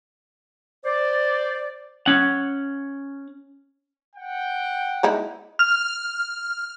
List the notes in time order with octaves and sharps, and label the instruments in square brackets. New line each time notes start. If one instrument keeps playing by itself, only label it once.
[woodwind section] C5 D5
[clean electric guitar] C#4 F#5
[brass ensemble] F#5 G5
[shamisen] G#3 D#4 E4
[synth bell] F6